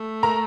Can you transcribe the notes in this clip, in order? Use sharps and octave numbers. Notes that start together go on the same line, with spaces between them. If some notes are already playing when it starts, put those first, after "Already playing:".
Already playing: A3
A#4 A#5